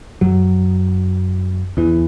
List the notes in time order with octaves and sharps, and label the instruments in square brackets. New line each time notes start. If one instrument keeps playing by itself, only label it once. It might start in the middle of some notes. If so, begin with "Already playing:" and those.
[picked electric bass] F#2 F#3
E2 E3